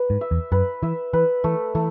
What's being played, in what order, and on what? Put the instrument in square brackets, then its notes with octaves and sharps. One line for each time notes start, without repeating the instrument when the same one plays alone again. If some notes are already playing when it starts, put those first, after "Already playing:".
Already playing: [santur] B4
[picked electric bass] G#2
[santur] E5
[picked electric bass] E2
[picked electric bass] F#2 [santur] B4
[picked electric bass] E3 [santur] E5
[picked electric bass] E3 [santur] B4
[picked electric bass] E3 [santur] A3
[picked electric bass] E3 [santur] A3